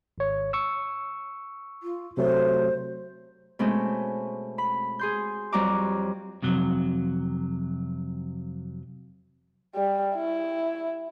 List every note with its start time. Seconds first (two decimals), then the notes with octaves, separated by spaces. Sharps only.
0.18 G#1 C#5
0.53 C#6 E6
1.82 F4
2.17 C3 F#3 A3 C5
3.59 B2 G#3 A3 C4 C#4
4.58 B5
4.99 G#4 C6 G6
5.53 F2 F#3 G3 F#4 A#5 D6
6.42 F2 C3 F#3
9.75 G3
10.15 E4